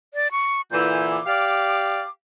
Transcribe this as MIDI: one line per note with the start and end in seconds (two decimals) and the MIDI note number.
0.14 0.31 74
0.31 0.61 85
0.71 1.18 46
0.71 1.18 50
0.71 1.18 52
0.71 1.09 91
1.10 2.10 86
1.26 2.01 67
1.26 2.01 74
1.26 2.01 77